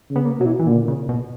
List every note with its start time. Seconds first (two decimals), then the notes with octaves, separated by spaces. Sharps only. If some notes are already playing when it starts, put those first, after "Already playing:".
0.10 C#3
0.16 B3
0.25 A#3
0.39 B2 F#3
0.45 E3
0.59 E3
0.66 A#2 D3
0.88 C#3
1.09 B2